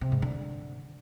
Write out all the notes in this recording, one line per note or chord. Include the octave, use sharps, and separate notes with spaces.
C3
G#2
D3